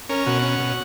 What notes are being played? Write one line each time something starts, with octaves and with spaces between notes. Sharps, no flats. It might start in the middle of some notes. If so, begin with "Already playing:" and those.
C#4 A#4
B2 F#4
C#4
B2